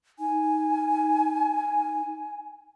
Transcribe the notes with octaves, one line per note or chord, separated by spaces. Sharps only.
D#4 G#5